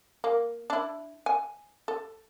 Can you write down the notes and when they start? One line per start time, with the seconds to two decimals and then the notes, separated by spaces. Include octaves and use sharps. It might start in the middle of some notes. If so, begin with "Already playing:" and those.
0.24 A#3
0.70 D4 E4
1.26 G#5
1.88 A4